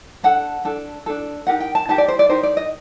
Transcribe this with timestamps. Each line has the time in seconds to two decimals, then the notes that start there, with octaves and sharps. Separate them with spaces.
0.23 D4 A4 F#5
0.65 D4 A4
1.06 D4 A4
1.47 D#4 G4 A#4 F#5
1.60 G5
1.75 A5
1.88 D#4 G4 A#4 A5
1.98 D5
2.08 C5
2.19 D5
2.29 D#4 G4 A#4 C5
2.43 D5
2.57 D#5